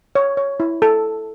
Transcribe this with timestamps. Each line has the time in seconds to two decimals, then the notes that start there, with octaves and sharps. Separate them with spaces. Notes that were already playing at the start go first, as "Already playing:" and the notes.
0.15 C#5
0.37 C#5
0.60 E4
0.82 A4